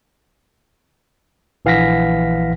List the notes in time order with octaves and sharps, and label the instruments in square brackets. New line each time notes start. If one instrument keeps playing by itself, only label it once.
[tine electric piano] A#1 E3 F5 F#5 A#6 B6